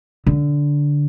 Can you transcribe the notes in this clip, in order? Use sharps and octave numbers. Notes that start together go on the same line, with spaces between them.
D3